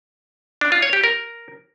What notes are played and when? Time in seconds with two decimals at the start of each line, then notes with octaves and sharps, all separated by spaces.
0.61 D4
0.72 F4
0.82 C#5
0.93 G4
1.04 A#4